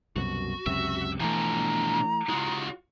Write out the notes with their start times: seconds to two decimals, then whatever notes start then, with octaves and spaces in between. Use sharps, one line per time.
0.16 C2 F#2 B2 F#4
0.66 C#2 F#2 C3 E5
1.20 B2 E3 F3 A3 D4 G#5 A#5
2.29 C#3 G#3 F4 F#4